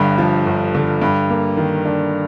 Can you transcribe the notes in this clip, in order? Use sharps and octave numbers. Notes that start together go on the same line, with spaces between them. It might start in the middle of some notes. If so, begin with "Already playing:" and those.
Already playing: G1 G2 D3
F3
G1
D3
G2
A#3
D#3
D4